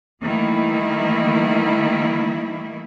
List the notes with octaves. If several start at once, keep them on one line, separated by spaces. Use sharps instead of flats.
D#3 E3 G3 A3 A#3 E4